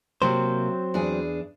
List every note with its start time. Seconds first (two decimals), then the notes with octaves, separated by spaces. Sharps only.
0.22 C3 F#3 A#3 C4 C5
0.94 E2 D4 G#4